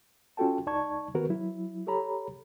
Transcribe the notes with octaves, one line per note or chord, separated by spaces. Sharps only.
C#4 F4 F#4 A4 G5 A5
C#2 D#4 D5 A5 C#6 G#6
D#3 B3 F#4 A#4 B4
F#3 E4
G4 A4 C#5 A#5 B5